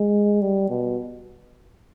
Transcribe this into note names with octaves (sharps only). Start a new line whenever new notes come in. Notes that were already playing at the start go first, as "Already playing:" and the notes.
Already playing: G#3
G3
B2